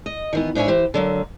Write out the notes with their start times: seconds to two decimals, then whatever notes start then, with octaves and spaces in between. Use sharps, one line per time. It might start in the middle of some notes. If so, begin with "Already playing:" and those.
0.06 D#5
0.33 D#3 E3 B3
0.55 G#2 D4 E4 C#5 E5 G#5
0.68 E3 G4 C5
0.94 D3 F#3 A#3